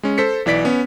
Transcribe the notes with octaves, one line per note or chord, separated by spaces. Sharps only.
G#3 C#4
A4 C5 B6 C#7
B1 E3 D5 B6 D7
B3 C#4